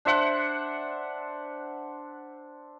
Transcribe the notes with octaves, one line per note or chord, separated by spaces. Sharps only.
D4 C5 E5 F#5